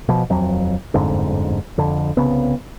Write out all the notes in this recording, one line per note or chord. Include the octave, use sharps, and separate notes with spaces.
B2 F3
D#1 F2 F#3
G1 F2 G#2 D3
F2 D3
C2 C#3 B3